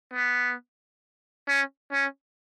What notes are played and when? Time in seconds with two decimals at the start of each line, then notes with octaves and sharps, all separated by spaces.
0.14 B3
1.48 C#4
1.93 C#4